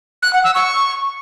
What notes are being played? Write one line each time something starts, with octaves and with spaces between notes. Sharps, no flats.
F#6
F#5
E6
C#6